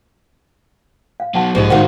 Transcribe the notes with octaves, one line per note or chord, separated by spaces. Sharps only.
F5
F#3 B3 F#5 A5
B1 G#2 F3 G#3 A#3 G4 D#5
D#2 G#2 D#3 F4 F#4 C5 F#5